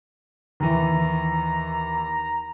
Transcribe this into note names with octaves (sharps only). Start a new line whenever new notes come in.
D#2 E3 A#5